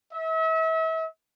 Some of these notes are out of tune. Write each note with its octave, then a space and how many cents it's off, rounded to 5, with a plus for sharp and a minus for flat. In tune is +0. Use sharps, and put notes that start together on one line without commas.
E5 -35